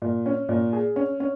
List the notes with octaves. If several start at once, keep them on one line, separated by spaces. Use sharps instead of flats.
A#2
C#4
A#2
G#4
C#4
C#4